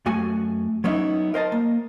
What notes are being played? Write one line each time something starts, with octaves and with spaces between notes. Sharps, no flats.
F#2 A3 F#4 G#5
F#3 B3 C#4 D#4 E4
A#4 C5 D#5 A5
A#3